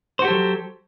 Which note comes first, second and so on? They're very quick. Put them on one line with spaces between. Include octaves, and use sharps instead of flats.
C5 F#4 G4 A4 F#3